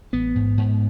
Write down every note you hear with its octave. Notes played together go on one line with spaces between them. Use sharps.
A1 B3
G#2
G#2